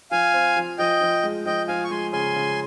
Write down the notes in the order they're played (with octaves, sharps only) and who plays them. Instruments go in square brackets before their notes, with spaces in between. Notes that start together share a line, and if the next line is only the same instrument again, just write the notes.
[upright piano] F3 [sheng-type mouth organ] F5 G#5
[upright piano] C4
F3
[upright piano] F3 [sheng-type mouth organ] D#5 G5
[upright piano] F3
G#3
[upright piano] F3 [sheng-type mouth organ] D#5 G5
[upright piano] F3 [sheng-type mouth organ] F5 G#5
[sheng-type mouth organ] C#6
[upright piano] G#3 [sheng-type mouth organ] G#5 C6
[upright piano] C#3 [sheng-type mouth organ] G#5 C6
[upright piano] C#3